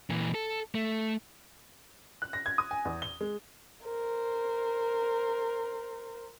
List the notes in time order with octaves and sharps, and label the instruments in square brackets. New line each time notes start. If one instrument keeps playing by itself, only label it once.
[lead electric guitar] A#2 E3
A4
A3
[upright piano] F#6
A#6
G#6
D#6
G#5
E2
G7
G#3
[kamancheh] A#4 C5